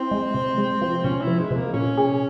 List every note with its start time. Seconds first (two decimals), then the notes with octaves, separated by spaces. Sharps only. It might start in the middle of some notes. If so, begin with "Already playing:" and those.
Already playing: C4 E4
0.11 G#3
0.34 C3
0.58 G#3
0.81 F3
1.04 C3 C#4
1.21 E4
1.27 F3
1.40 G#3
1.51 C3
1.56 A#3
1.73 A#2 C#4
1.98 G#4